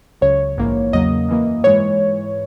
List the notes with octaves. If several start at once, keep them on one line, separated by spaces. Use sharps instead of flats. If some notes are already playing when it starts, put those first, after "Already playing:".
C#2 C#3 F#3 C#5
A#1 G#2 E3 A#3
E2 C#3 F#3 A#3 D#5
F#2 E3 A#3
G#2 E3 G#3 C#5